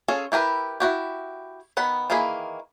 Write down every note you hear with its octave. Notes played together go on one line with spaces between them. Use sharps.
C#4 F4 G#4 A4
E4 G4 A#4 B4
E4 F#4 G4
D#3 B3 F#5 B5
D#3 E3 A#3 G#4 B5